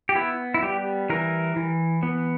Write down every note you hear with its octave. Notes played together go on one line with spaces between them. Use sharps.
G4
B3 E4
E4
G3 G4
E3 A#4
E3
B3